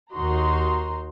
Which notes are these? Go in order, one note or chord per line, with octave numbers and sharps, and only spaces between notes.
D#2 D#4 F#4 A#5 C6